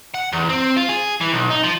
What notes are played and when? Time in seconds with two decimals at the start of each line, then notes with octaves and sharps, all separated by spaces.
0.14 F#5
0.33 E2
0.49 C4
0.76 F4
0.89 G#4
1.21 E3
1.33 B1
1.50 D#4
1.64 F3